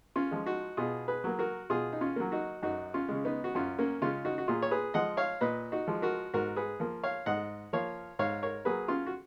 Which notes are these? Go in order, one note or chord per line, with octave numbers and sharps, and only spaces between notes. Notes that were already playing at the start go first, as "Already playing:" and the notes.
C#4 F4
F3 G#3
D#4 F#4
B2 F4 G#4
G#4 B4
F#3 A#3
F#4 A#4
B2 F4 G#4
D#4
C#4 F4
F#3 A#3
D#4 F#4
F#2 D#4 F#4
C#4 F4
C#3 G#3
B3 D#4
F#4
F#2 C#4 F4
A#3 C#4
C#3 G#3 C#4 F4
D#4 F#4
F#4
A#2 F4 G#4
C#5
G#4 B4
F3 G#3 D#5 F#5
C#5 F5
A#2 B4 D#5
D#4 F#4
F3 G#3
F#4 A#4
G#2 F#4 A#4
G#4 B4
F3 A#3
C#5 F5
G#2 D#5 F#5
F3 A#3 C#5 F5
G#2 C#5 F5
A#4 C#5
F#3 A#3 G#4 B4
C#4 F4
F#4